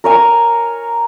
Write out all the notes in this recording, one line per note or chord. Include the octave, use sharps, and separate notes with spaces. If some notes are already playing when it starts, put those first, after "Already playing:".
A#4 C#5 G#5